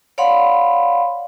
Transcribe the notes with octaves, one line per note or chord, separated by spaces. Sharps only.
C#5 D5 F5 F#5 B5 C6